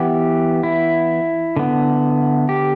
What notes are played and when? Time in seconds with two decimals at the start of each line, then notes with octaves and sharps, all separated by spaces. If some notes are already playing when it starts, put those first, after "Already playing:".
Already playing: E3 B3 G4
0.63 E4
1.57 D3 B3
2.49 G4